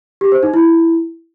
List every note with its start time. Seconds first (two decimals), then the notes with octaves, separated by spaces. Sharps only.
0.21 G4
0.32 C5
0.43 D#4
0.54 E4